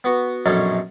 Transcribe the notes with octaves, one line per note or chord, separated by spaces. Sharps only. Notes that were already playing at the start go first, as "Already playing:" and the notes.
B3 F#4
A#1 F#2 B2 C#4 D#4 A4